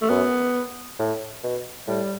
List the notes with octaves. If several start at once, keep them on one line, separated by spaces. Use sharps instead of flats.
A3
F#2 B3
A2
B2
A2 G3